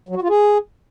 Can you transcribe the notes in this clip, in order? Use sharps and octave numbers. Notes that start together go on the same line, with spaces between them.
F#3
F#4
F4
G#4